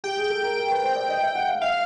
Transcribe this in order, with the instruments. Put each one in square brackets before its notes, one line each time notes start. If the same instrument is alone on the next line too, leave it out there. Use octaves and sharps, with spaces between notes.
[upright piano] G4 [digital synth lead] G5
[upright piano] G#4
A4
A#4
A#4
B4
C5
D5
D#5
E5
F#5
F5
[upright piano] E5 [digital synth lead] F5